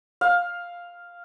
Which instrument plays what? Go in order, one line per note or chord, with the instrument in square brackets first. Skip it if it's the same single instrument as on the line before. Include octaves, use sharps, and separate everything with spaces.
[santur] F5